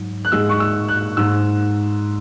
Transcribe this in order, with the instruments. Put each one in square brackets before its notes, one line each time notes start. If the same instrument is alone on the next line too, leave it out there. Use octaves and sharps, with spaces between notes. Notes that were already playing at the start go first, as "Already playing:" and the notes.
Already playing: [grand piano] G#2 F#3
F#6
G#2 G#3 E6
C#6
E6
F#6
G#2 G#3 E6